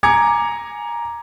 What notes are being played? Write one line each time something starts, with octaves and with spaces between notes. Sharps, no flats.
G#5 A#5 D6 G#6 C#7